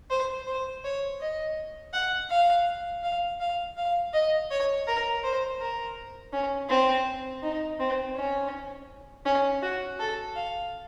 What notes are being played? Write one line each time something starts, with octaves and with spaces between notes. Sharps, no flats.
C5
C5
C#5
D#5
F#5
F5
F5
F5
F5
D#5
C#5
A#4
C5
A#4
C#4
C4
D#4
C4
C#4
C#4
F#4
A4
F5